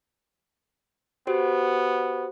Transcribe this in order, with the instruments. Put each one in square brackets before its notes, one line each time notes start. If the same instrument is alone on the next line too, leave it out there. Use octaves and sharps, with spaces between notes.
[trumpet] B3 [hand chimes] F#4 G4 C5